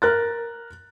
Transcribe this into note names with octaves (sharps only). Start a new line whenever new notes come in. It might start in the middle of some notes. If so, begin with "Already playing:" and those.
A#4 F#6 A6